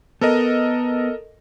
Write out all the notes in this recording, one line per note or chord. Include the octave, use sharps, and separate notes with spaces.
B3 A4 A#4 D#5